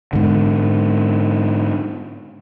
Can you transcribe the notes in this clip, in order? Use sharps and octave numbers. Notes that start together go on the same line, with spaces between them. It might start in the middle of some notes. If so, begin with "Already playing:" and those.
G#2 D3